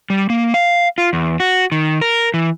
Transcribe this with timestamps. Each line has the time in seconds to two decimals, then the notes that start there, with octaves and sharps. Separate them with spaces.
0.10 G3
0.30 A#3
0.54 F5
0.98 F4
1.13 E2
1.40 F#4
1.72 D#3
2.01 A#4
2.34 E3